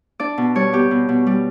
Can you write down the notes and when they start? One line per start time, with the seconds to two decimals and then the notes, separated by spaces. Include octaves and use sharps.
0.20 D4 D5
0.38 B2
0.55 G3 C#5
0.73 B3 G4
0.91 B2
1.09 B2
1.27 G3